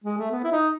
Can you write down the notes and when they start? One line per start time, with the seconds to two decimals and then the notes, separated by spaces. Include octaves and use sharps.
0.04 G#3
0.18 A3
0.31 B3
0.44 E4
0.52 D#4